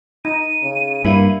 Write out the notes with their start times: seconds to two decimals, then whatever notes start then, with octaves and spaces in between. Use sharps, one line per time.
0.25 D#4 D#7
0.63 C#3
1.05 G2 A#3 E4